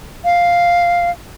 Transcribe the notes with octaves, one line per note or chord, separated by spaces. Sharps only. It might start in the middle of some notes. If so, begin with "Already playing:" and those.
F5